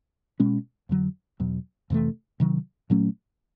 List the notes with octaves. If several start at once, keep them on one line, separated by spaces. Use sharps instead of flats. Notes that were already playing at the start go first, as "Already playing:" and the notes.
B2 G#3 C#4
F2 D3 F#3
E2 B2 F#3
F2 C3 E3 A3
C3 D#3 F#3
A#2 F#3 A3 C#4